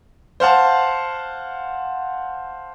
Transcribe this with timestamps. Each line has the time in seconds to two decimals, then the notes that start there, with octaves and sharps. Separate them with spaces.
0.40 C5 F5 F#5 A5